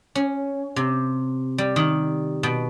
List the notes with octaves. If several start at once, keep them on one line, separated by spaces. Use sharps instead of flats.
C#4
C3
G3
D#3
B2